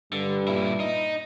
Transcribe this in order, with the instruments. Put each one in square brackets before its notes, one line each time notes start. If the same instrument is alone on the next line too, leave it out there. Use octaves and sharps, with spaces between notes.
[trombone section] G2 G3 [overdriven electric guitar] D3
[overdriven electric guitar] A#2 E4
D#4